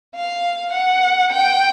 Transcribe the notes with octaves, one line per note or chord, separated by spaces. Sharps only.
F5
F#5
G5